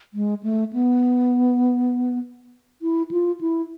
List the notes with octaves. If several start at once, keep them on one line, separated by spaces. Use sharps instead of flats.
G#3
A3
B3
E4
F4
E4